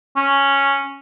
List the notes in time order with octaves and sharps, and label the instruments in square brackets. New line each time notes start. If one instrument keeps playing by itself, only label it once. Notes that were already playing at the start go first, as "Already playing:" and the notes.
[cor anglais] C#4